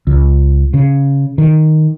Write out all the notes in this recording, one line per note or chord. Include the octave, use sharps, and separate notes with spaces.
C#2
C#3
D#3